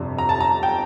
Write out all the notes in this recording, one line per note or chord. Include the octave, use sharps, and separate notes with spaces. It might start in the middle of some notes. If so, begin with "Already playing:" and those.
Already playing: G1 F2 C3 G3 D4
A#5
A5
A#5
G5